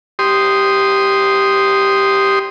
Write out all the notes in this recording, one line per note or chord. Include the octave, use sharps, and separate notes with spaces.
G4 C6 D#6